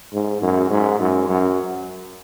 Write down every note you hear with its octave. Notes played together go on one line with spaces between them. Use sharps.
G#2
F#2
G#2
F#2
F#2